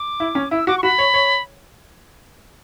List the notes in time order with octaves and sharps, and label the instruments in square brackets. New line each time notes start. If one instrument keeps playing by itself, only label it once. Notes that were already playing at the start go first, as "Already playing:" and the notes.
Already playing: [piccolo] D6
[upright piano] E4
C#4
[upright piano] E4 [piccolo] E6
[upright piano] F#4 [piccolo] D6
[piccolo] C#6
[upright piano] F#4 [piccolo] B5
[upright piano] C#5
C#5